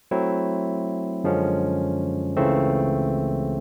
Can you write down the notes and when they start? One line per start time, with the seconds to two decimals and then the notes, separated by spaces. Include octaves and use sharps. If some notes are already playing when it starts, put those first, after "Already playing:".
0.11 F#3 A3 C4 E4
1.24 F#2 D3 F3 G#3 C#4
2.37 C#2 C#3 E3 A3 C4